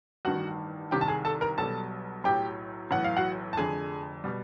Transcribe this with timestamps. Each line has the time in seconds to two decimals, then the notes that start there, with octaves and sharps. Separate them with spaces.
0.25 A1 G2 D#3 F#4 F#5
0.91 C2 C3 D#3 G4 G5
1.01 A5
1.08 G#4 G#5
1.25 A4 A5
1.41 A#4 A#5
1.58 B1 B2 G3 A4 A5
2.24 B1 A2 F#3 G4 G5
2.91 B1 A2 E3 F#5
3.04 F5
3.17 F#4 F#5
3.53 A5
3.57 F1 F2 D3 G#4 G#5
4.24 B2 G3